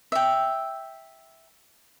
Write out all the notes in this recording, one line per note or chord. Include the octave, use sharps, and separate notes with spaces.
E5 G5